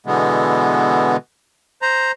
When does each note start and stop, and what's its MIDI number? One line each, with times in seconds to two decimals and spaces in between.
0.06 1.16 47
0.06 1.16 50
0.06 1.16 52
0.06 1.16 56
0.06 1.16 59
1.82 2.12 72
1.82 2.12 82